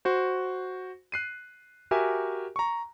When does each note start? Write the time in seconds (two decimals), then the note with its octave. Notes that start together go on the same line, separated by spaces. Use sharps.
0.05 F#4 C5
1.12 F#6 C7 D#7
1.91 F#4 G4 A#4 E5 G#5
2.56 A#5 C#6